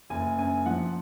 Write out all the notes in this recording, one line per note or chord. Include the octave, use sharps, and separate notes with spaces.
F#1 G#5
F#2 G#5
F3 F#5